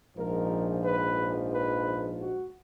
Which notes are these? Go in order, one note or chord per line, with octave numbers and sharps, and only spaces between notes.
A#1 G#2 F3 A#4
B4
B4
F#4